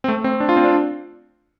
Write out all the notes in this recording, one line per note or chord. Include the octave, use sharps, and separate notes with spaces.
C4
A3
C4
D4
F4
C4
D4